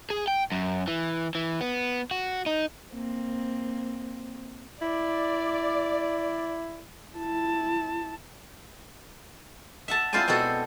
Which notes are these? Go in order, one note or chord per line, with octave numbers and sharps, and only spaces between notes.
G#4
G5
F#2
E3
E3
B3
F#4
D#4
A#3 C4
E4 D5
E4 A5
E5 F#5 A5
C4 E4 F4 C5 D5 G#5
B2 C4 F#4 A4 F#5